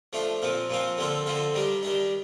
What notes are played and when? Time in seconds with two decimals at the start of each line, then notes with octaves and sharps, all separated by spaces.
0.13 F3 A3 D4 F4
0.42 A#2 F3 C4 F4
0.70 A#2 F3 C4 F4
0.98 D3 F3 C4 F4 A4
1.26 D3 F3 C4 F4 A4
1.54 D#3 G3 D4
1.83 D#3 G3 D4